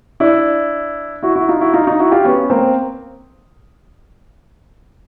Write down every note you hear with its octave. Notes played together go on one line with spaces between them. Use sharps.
D4 E4
E4 F#4
E4 F#4
D#4 F4
E4 F#4
D#4 F4
D#4 F4
E4 F#4
F4 G4
B3 C#4
A#3 C4